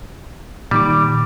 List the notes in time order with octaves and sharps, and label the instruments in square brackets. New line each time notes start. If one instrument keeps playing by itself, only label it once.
[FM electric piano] A#2 D#3 D6 [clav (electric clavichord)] G3